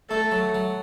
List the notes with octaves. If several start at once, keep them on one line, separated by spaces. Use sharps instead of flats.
A3 A4
F#3
F#3